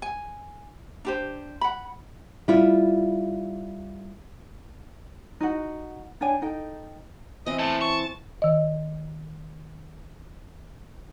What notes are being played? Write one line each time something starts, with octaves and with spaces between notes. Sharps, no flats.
G#5
D4 G4 C5
F#5 B5
G3 E4 F4
D#4 F#4 F#5
D4 C#5 G5 G#5
D#4 A4 G5
E3 C4 D#5
A2 A5
A5 C#6
D#3 D#5